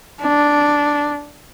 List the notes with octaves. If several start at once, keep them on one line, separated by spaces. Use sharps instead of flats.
D4